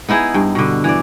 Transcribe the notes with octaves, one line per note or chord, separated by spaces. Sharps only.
B3 D#4 E4 G#4
G2
B2 D3
E3 D5